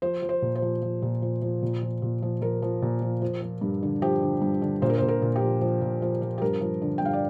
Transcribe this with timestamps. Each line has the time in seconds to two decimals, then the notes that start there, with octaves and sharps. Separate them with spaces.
0.02 F3 C5
0.22 F3
0.29 C5
0.42 A#2
0.55 C5
0.62 F3
0.82 F3
1.02 A#2
1.22 F3
1.42 F3
1.62 A#2
1.82 F3
2.02 A#2
2.22 F3
2.41 F3 A#4
2.62 F3
2.82 A#2
3.02 F3
3.22 F3
3.42 F3
3.61 G2
3.83 D3
4.02 F3 G4
4.22 D3
4.42 G2
4.62 D3
4.82 A#2 C5
4.90 A#4
4.98 C5
5.02 A#2
5.08 A#4
5.22 A#2
5.36 G4
5.41 F3
5.61 F3
5.82 A#2
6.02 F3
6.22 F3
6.38 G4
6.42 G2 A#4
6.61 F3
6.82 D3
6.98 G5
7.02 G2 F5
7.13 D5